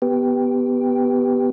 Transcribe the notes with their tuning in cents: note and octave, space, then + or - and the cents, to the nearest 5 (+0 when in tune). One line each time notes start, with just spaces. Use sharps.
B3 +0 G4 +0